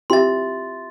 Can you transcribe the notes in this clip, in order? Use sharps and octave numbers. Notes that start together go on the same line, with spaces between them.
C4 E4 F4 G4 E5 C6 A6